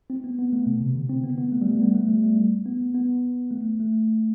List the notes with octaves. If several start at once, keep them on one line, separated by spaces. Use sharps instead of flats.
C4
B3
B3
A3
B2
C3
D3
C4
B3
B3
A3
G3
A3
B3
A3
G3
A3
B3
B3
A3
A3